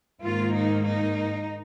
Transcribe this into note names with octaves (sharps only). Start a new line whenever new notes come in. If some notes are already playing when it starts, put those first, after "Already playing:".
G#2 D#3 A#3 F4
D#4
D#4